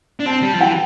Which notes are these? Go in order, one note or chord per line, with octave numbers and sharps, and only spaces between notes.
D4
C4 A5
G3
F3
E3 G5